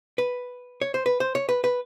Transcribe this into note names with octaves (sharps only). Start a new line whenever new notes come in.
B4
C#5
C5
B4
C5
C#5
B4
B4